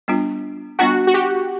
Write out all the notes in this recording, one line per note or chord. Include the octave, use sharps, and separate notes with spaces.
G3 B3 D4 F4
G3 B3 D4 F4 F#4
F#4
G4